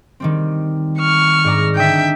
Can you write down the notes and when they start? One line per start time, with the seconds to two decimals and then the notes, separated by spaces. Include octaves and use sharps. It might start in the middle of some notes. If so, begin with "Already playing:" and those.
0.20 D#3 G3 C4
0.99 C#6 F6
1.44 G#2 D5 A#5
1.76 D3 D#4 E5 G5